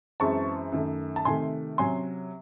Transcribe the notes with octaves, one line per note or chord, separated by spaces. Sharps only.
F#2 E3 G#3 C4 A5 C#6
F#2 D#3 A3
A5
C3 D#3 A3 G#5 C6
C3 F#3 C#4 G#5 C6